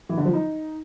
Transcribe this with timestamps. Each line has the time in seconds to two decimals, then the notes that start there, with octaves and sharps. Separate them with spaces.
0.09 E3
0.17 D3
0.25 F3
0.33 D#4